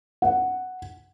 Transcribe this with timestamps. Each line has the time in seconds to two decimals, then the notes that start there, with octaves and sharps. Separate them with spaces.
0.22 F#5